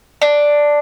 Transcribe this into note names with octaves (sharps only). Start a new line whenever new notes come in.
D4